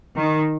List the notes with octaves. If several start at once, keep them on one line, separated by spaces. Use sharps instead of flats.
D#3